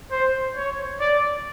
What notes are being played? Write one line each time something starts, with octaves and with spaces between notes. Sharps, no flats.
C5
C#5
D5